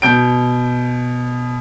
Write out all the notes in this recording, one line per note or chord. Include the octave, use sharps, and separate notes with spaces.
B2 G6 D7